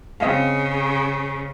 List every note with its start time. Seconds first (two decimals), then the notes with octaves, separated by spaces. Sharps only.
0.20 C#3 C4 D#5 F5